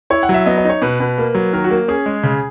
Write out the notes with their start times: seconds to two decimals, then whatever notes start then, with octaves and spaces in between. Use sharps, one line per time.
0.10 E4 C#5
0.23 F#5
0.29 F#3
0.34 E5
0.46 B3 D#5
0.58 D#5
0.65 D#4 C#5
0.82 B2 B4
1.00 B2
1.18 A#3
1.35 F#3
1.53 D#3 A#4
1.64 F#4
1.70 A#3
1.88 C#4 G#4
2.06 G#3
2.23 C#3